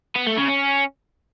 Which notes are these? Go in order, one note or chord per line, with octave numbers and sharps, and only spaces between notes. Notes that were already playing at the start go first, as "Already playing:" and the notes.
B3
A3
C#3
C#4